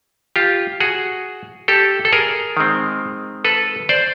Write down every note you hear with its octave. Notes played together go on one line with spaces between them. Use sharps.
F4 G4
F#4 G#4
G4 A4
A4
G#4 A#4
D#3 G#3 C4
A4 B4
C5 D5